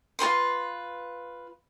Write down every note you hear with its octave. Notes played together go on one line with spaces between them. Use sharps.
F4 F#4 B4 C6